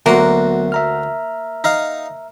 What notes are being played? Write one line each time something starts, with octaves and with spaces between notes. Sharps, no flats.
D2 F#3 A#3 B3 F#4 C6
E5 A#5 F6
D#4 F5